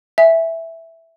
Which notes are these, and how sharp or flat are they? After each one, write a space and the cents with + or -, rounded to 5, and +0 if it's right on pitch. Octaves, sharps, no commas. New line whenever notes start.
E5 +0 G#5 -10